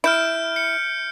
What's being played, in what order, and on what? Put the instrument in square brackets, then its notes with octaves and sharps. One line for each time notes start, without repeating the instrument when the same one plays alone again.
[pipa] E4 [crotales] F6 G6 D7
[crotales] C#7